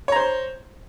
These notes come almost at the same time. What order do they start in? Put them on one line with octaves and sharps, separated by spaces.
C#5 A#5 C5 C6